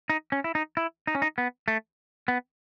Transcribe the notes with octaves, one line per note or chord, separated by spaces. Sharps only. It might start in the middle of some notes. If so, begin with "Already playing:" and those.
D#4
C#4
E4
D#4
E4
D#4
C#4
D#4
B3
A3
B3